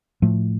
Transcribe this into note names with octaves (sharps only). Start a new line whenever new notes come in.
A2 F3 A3